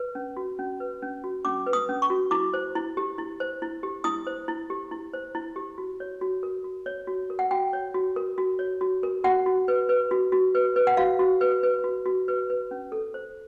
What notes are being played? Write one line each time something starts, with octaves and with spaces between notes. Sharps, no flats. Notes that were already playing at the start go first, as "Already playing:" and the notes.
Already playing: B4
C#4
F#4
C#4
B4
C#4
F#4
C#4 D6
B4
D#6
C#4
C#6
F#4
E4 D6
C5
E4
G4
E4
C5
E4
G4
E4 D#6
C5
E4
G4
E4
C5
E4
G4
F#4
C#5
F#4
A#4
F#4
C#5
F#4
A#4
F#5
F#4 G5
C#5
F#4
A#4
F#4
C#5
F#4
A#4
F#4 F#5
F#4
B4
B4
F#4
F#4
B4
B4
F#5
F#4 F5
F#4
B4
B4
F#4
F#4
B4
B4
C#4
A4
C5